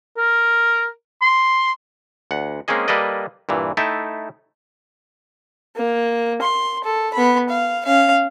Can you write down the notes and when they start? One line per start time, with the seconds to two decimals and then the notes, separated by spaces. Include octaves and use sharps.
0.17 A#4
1.21 C6
2.31 D2 F#5
2.68 G#3 A#3 C4 C#4 G#4 D#5
2.88 G3 A#3 A4 B4 D5 D#5
3.49 G2 A#2 E3
3.77 A3 D#4 E4 E5 G5 A5
5.76 A#3
6.42 C6
6.84 A4
7.14 B3 B5
7.49 F5
7.85 C#4 F5